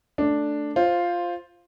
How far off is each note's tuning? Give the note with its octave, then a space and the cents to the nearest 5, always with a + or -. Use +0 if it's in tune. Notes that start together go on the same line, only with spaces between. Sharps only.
A3 +0 D4 +0
F4 +0 C5 +5